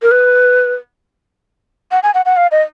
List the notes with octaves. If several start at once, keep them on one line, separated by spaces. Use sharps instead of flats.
A#4
B4
F#5
G#5
F#5
F#5
F5
D#5